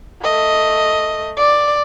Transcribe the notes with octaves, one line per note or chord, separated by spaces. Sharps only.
A3 D#5
D5